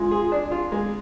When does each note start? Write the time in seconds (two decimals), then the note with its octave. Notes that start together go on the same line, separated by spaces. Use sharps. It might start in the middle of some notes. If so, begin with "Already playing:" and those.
Already playing: G#3 F4
0.11 G#4
0.32 D4
0.52 F4
0.72 G#3